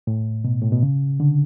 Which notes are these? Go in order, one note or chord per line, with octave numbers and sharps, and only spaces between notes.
A2
B2
A2
B2
C#3
D3